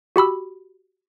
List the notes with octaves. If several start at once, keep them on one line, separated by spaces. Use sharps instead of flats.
F#4 G4 B5 E6